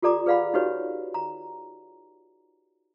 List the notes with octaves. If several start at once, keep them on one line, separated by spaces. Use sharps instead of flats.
F4 G4 A4 D5 A#5 D6
G#4 B4 D5 F5 F#5 B5
D#4 F#4 G4 B4 C#5
A#5